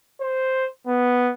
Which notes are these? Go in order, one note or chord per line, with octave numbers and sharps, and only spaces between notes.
C5
B3